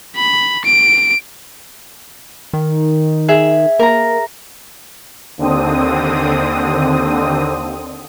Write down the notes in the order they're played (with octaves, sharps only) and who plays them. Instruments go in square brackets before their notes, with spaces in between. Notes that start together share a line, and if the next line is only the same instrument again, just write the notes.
[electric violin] B5
D7
[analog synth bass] D#3
[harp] G#4 E5
[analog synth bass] A#3 [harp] A#4 A#5
[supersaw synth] D#2 D3 C4 D#6